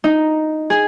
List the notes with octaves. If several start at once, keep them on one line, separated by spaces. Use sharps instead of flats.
D#4
G#4